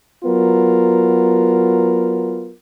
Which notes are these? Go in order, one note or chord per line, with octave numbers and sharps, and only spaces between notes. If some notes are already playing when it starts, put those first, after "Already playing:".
F#3 B3 F4 A#4